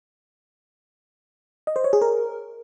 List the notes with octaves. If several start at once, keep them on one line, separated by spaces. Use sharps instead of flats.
D#5
C5
C#5
G#4
A#4